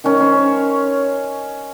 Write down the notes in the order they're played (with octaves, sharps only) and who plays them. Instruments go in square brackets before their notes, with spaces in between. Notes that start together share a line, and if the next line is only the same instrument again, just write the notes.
[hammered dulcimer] D#3 C#4
C#4 C5 C#5